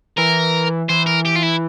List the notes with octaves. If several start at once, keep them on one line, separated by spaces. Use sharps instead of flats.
E3 A#4
E3 C5
A#4
G4
F4
E4